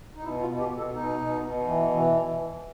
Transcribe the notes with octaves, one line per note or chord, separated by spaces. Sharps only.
D#4
B2 E4
F4
B2
G4
B2
A4
B2 D#4
B2
B2
E3
E3